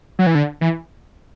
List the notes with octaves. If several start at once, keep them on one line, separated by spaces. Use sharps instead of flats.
F#3
E3
D3
E3